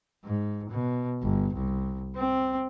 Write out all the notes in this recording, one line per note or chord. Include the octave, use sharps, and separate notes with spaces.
G#2
B2
G1
C2
C4